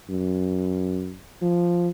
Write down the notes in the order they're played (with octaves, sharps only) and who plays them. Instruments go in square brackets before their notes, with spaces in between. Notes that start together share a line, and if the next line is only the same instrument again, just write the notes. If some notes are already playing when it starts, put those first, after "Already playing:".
[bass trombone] F#2
F3